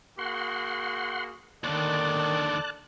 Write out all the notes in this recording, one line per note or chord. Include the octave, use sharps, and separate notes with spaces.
A#3 F#4 G#4 F#5 C6
D#2 D3 D#3 A4 D5 A5 F#6